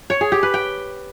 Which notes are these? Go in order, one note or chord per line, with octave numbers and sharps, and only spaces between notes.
C#5
G#4
G4
B4
G5